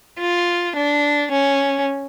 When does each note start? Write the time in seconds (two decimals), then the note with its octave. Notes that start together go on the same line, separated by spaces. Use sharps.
0.19 F4
0.75 D4
1.31 C#4